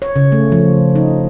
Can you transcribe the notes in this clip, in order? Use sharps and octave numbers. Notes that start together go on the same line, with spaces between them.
C#5
C#3
A3
F3
D#4